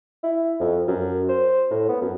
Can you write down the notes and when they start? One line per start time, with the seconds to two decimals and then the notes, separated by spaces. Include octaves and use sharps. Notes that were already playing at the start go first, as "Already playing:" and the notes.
0.23 E4
0.60 F2
0.88 F#2
1.29 C5
1.71 A2
1.89 B3
2.02 F#2